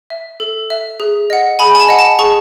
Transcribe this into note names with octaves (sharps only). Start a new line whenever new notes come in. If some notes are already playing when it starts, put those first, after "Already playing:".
E5
A4
E5
G#4
D#5 F#5
G#4 G#5 B5
G#5
A5
D#5 F#5
A5
G#4 A5 C#6